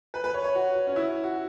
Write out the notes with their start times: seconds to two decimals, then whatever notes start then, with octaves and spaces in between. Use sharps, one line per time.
0.14 B4
0.24 B4
0.34 C#5
0.44 C#5
0.55 F#4
0.87 C#4
0.96 E4
1.24 F#4